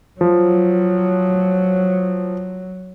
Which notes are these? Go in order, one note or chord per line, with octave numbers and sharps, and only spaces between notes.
F3 F#3